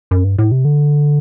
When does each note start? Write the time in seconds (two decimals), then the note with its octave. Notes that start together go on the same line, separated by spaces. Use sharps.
0.11 F#2
0.24 G2
0.38 A2
0.52 C3
0.65 D3